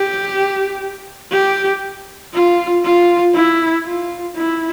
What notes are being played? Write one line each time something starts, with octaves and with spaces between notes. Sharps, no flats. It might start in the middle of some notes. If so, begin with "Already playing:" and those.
Already playing: G4
G4
F4
F4
E4
F4
E4